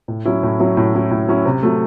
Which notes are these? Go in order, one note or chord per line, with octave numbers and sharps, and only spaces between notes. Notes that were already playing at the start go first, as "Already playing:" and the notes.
A2
F#3 C#4 E4
A2
F#3 C#4 E4
A2
F#3 C#4 E4
A2
F#3 C#4 E4
C3
F#3 A3